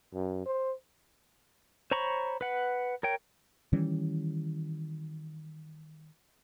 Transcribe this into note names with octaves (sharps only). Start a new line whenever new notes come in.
F#2
C5
C5 C#5 A#5 B5 C#6
B4 F#5
A#4 C#5 G5
D#3 E3 G3 C#4